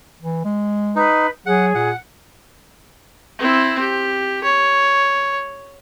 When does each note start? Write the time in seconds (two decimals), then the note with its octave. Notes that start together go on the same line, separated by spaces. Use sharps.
0.21 E3
0.45 G#3
0.96 D#4 B4
1.46 F#3 G#4 F#5
1.75 A#2 F#5
3.39 C4 E4
3.80 G4
4.44 C#5